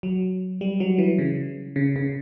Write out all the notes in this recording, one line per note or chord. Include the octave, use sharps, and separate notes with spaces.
F#3
G3
F#3
E3
C#3
C#3
C#3